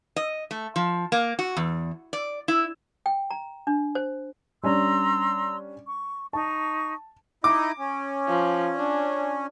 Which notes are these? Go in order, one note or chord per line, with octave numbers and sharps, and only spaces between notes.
D#5
A3
F3
A#3
F#4
E2
D5
E4
G5
A#5
D4
C5
G3 C#4 D4 A#5 C6 E6
C#6
D#4 A5 C#6
D#4 E4 D#5 D6
C#4
F3
D4